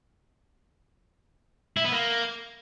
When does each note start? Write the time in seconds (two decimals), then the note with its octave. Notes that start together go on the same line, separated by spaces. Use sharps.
1.77 E4
1.85 B3
1.93 A#3